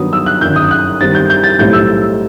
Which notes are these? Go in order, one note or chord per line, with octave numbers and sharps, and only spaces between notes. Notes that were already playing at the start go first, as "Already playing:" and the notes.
Already playing: G2 D#3 F#3 B3 D#6
E6
F#6
G1 F#2 D#3 G6
D#6
F#6
G2 D#3 G3 C4 A6
G6
G6
A6
B1 A2 G3 C4 G6
E6